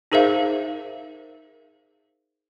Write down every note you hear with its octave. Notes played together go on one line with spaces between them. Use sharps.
D#4 G#4 A#4 C5 E5 F5